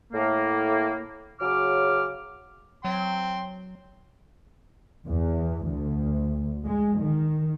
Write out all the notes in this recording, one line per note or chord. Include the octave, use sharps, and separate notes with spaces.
A2 A#3
C#3 F#3 D6 F6
F#3 G5 C6
E2
D2
G#3
D#3